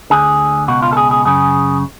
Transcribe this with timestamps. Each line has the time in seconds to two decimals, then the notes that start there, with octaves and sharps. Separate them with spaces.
0.10 D2 D3 G#4
0.68 C#2 B2 F#4
0.82 F4
0.93 A4
0.97 G#4
1.11 G#4
1.25 F#2 C#3 G#4